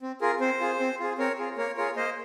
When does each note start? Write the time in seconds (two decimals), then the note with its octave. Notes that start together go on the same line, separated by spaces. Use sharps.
0.02 C4
0.21 F4 G#4 A#4
0.40 C4 C5
0.60 F4 G#4
0.80 C4
1.00 F4 G#4
1.18 C4 A#4 C#5
1.39 F4 G#4
1.57 A#3 A#4 C#5
1.77 F4 G#4 A#4 C#5
1.96 A#3 C5 D#5